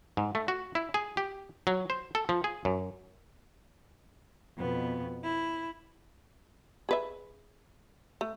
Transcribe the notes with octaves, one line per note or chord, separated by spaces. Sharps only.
G#2
A3
F#4
E4
G#4
G4
F#3
C5
A4
F3
G#4
F#2
F2 B2 B3
E4
G#4 B4 E5
A3